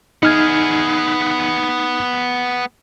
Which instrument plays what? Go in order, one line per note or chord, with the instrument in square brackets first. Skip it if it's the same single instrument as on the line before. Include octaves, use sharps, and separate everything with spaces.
[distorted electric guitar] B3 G#4 [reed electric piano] D#4 F6 G#6